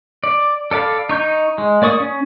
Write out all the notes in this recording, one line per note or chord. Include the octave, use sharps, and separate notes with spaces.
D5
A4 D5 F5 B5
D#4 C#6 G6
G#3
A#3 D5 C#6 D#6
C#4